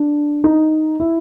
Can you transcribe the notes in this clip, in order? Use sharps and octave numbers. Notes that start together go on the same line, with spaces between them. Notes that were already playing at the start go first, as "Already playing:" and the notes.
Already playing: D4
D#4
E4